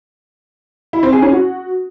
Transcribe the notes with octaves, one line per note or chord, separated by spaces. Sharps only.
E4
C4
G#4
C#4
F#4